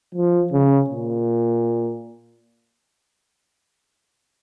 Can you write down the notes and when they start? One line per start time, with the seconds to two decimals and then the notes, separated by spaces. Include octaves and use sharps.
0.15 F3
0.52 C#3
0.90 A#2